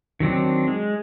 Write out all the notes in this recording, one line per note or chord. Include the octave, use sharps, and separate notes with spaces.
D#3 F#3 C4 D4
G#3